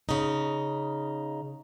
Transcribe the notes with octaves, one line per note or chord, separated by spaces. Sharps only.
C#3 D#4